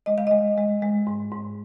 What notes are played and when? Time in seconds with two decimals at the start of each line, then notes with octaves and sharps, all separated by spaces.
0.06 G#3 D#5
0.18 F5
0.27 G#3 D#5
0.57 G#3
0.82 G#3
1.07 G#2
1.31 G#2